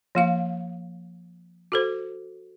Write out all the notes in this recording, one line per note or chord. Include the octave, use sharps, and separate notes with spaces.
F3 A#3 F5
F#4 A4 C5